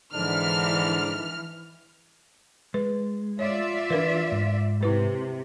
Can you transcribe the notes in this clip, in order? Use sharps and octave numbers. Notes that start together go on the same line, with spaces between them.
G#2 D3 E3 D4 F6
G#3 B4
F4 C#5 D5 E5
E3 D4 A#4 B4
G#2
C3 E4 B4